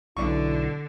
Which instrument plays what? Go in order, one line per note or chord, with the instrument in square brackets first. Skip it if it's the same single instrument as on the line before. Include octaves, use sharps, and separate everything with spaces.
[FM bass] B1 [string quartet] D3 [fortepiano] D4 C#6 [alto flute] E4